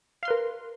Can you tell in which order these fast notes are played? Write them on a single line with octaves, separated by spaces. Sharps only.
F5 C6 B4 A#4